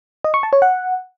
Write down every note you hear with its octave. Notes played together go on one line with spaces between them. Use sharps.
D#5
C#6
A5
C#5
F#5